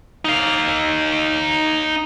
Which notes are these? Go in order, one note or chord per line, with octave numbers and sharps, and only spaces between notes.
D#4 F5